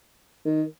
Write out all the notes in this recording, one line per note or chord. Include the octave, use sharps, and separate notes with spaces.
D#3